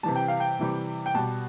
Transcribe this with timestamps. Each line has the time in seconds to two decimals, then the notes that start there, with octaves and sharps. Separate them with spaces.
0.03 C3 E3 G3 A5
0.16 G5
0.28 F5
0.40 G5
0.59 C3 E3 G3
1.06 G5
1.15 B2 G3 A5